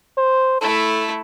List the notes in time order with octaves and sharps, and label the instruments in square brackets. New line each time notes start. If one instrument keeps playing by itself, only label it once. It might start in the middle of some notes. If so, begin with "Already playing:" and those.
[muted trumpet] C5
[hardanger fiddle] A3 E4 [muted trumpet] A4